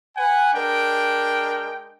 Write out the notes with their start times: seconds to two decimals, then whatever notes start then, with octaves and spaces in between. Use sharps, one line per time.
0.17 B4 F#5 G#5
0.53 G#3 D4 A#4 G5